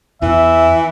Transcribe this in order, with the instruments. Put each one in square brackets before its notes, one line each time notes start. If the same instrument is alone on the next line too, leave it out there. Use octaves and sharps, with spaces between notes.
[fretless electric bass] E2 [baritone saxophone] E3 [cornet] E5